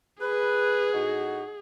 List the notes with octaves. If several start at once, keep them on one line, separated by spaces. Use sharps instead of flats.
G#4 B4
A2 D#4 F#4